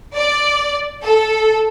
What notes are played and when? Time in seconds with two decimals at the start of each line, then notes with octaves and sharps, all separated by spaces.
0.15 D5
1.02 A4